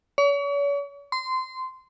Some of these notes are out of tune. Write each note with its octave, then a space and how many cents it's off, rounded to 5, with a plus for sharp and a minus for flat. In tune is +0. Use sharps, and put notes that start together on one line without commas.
C#5 +40
C6 -20